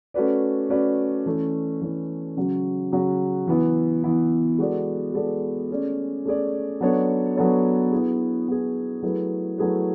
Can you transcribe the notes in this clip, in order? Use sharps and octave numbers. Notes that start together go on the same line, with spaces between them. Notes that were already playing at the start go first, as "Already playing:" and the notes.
A3 C#4 F#4 B4 D5
A3 C#4 F#4 B4 D5
E3 A3 C#4
E3 A3 C#4
C#3 F#3 C#4 F#4
C#3 F#3 C#4 F#4
E3 B3 E4
E3 B3 E4
G#3 B3 F#4 A4 D5
G#3 B3 F#4 A4 D5
A3 C#4 G#4 D5
A3 C#4 G#4 D5
F#3 B3 D4 A4 C#5
F#3 B3 D4 A4 C#5
B3 E4 G#4
B3 E4 G#4
F#3 A3 E4 G#4 B4
F#3 A3 E4 G#4 B4